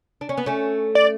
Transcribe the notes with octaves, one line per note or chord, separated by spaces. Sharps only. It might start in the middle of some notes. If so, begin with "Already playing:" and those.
D4
C#4
B3
A3 C#4
D5